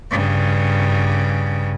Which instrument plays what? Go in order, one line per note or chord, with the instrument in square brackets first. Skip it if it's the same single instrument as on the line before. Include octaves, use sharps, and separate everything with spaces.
[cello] G2 C#3